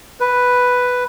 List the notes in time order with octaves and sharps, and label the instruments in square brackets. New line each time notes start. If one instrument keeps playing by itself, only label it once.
[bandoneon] B4